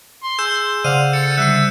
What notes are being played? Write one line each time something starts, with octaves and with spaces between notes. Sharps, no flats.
C6
G#4 E6 G6 E7
C#3 C5 D5 F5 F#5 D#7
A4 C#7
D3 G3 E5 F#6 C7 D#7